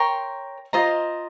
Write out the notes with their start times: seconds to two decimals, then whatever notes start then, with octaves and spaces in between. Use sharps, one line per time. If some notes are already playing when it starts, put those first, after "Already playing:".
Already playing: A#4 C#5 G5 C6
0.73 F4 C5 D#5 A#5